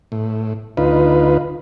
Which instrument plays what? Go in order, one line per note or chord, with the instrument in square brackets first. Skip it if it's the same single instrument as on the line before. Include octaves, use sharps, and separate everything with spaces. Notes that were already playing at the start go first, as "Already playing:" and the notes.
[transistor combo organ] A2
D2 D#4 F4 B4